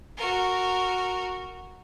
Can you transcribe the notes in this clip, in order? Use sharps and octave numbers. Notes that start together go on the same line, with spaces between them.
F#4 A#4